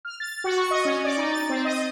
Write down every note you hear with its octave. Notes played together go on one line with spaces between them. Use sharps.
F6
A6
F#4
C#6
D#5
C#4
D5
D#4
A6
C4
D#5